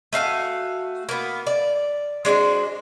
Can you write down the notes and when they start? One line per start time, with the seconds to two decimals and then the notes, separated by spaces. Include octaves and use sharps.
0.13 A3 F#4 F5 G#5
1.09 A#3 B3
1.47 D5
2.25 G#3 D4 F#4 C5